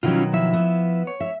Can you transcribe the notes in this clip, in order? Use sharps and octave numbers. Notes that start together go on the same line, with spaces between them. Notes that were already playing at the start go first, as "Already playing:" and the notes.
B2 D#3 F#3 C#4 E4 F4
F3 E4 E5
B3
C#5
E5